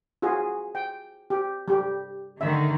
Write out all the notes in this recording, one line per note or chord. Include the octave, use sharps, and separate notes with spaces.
F4 F#4 G#4
G5
G4
G3 G4
D3 D#3 A3 E5